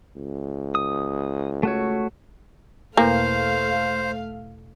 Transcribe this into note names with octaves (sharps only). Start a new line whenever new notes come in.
C#2
D#6
A3 F#4 C#5
E2 B2 A3 A#3 C5 F5